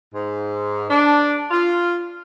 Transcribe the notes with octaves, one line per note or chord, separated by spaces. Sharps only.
G#2
D4
F4